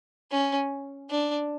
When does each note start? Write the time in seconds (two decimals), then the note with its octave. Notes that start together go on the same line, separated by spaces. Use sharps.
0.31 C#4
1.10 D4